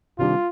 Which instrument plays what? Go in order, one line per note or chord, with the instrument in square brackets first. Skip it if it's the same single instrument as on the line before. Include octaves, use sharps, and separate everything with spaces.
[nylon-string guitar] C3 D#3 G3 D4 G4 [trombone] F4